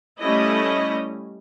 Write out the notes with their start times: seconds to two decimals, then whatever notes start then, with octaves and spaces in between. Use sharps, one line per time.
0.20 G3 A3 C#4 E4 D#5